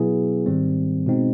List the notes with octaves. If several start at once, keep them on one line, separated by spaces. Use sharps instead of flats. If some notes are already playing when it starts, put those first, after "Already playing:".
Already playing: B2 F#3 B3 E4 G#4
G#2 D#3 G3 C4
B2 G#3 C4 D#4